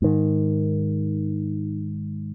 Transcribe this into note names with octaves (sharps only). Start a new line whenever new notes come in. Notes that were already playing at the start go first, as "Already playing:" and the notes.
G#2 D#3